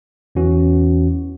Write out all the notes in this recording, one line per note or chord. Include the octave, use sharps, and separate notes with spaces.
E2 E3 C#4 F#4